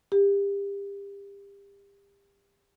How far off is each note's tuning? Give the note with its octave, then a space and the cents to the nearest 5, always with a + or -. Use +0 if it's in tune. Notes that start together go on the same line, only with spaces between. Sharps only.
G4 +30